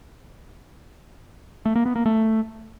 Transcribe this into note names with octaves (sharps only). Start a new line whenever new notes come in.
A3
A#3
B3
A#3
A3